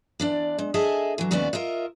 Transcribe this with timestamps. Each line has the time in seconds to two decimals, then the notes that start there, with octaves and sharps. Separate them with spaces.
0.20 E2 D4 D5
0.59 G#3
0.74 G#4 A4 D#5 E5 G#5 A5
1.18 E3 F#3
1.31 D#2 A#2 B3 C#4 F#4 D5
1.53 F4 A#4 D#5 E5